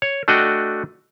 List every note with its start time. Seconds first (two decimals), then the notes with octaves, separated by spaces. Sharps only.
0.02 C#5
0.28 A3 D4 F#4 D#5 F#5 G5